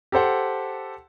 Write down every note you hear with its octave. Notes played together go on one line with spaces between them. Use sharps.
G4 A4 C5 F#5